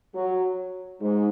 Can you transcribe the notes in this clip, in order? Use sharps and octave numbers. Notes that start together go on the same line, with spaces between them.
F#3
G#2